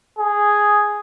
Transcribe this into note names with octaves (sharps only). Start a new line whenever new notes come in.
G#4